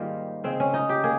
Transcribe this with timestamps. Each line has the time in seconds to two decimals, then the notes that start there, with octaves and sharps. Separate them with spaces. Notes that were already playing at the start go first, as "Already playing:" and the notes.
Already playing: G#2 D#3 G3 A#3 F4
0.44 C#3 G#3 C4
0.60 C#4
0.74 D#4
0.89 G4
1.04 A#3 G#4